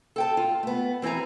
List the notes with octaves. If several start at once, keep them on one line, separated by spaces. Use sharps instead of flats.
A4 G5 A5
F4
A3 B3
E3 C4 E4 G#5 A#5